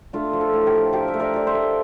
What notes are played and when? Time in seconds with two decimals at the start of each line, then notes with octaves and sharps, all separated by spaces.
0.13 A3 D4 F4
0.33 F3
0.41 F4 A4
0.53 A2
0.66 G4 A#4
0.73 F3
0.93 F3 G4 A#4
1.08 E5
1.14 A3
1.20 A#4 D5
1.34 F3 D5
1.47 C5 E5
1.54 A3